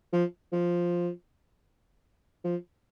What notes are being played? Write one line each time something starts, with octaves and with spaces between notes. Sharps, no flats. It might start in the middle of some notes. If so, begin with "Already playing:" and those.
F3
F3
F3